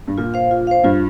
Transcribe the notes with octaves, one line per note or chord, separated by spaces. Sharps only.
G2
A#2 F4
C5 F5
F4
C5 F5
G2 F4